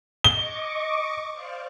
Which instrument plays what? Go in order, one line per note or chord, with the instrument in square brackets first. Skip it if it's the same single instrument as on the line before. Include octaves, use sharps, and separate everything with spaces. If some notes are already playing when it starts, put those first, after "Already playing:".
[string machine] D#5 C#6 D6 [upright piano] G7
[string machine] C5 D5 F5